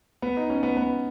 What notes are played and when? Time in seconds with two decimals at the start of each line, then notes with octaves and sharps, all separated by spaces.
0.22 B3
0.37 D#4
0.50 C#4
0.63 B3
0.77 B3